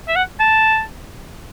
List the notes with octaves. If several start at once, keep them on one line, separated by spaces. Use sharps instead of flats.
E5
F#5
A5